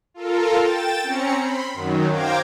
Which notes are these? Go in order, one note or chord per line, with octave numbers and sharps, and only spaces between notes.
F4 A4 A#4
G5 A6 E7
C4 C#4 A#5 C#7
B5 C6
F#2 D#3 F#3
C5 F5 G5 A#5 D6 G#6